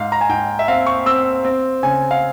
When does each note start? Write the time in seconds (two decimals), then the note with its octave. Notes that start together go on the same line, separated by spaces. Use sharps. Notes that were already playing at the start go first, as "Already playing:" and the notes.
Already playing: G#2 F5
0.12 A#5
0.21 G#5
0.29 G#2 G5
0.59 E5
0.68 C4 F5
0.86 C#6
1.06 C4 E6
1.45 C4
1.83 C#3 G#5
2.11 F5